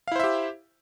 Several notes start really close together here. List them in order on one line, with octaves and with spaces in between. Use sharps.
F5 E4 C5 E5 G4